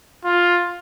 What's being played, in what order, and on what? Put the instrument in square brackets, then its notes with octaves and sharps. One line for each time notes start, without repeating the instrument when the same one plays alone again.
[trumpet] F4